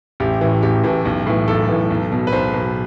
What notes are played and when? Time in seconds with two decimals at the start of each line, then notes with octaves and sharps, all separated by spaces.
0.20 A1 G4
0.41 A2 E3
0.62 A1 G4
0.84 A2 E3
1.05 B1
1.27 A2 E3
1.48 B1 A4
1.69 A2 E3
1.90 B1
2.12 B2
2.27 B4
2.32 B1 C5
2.54 B2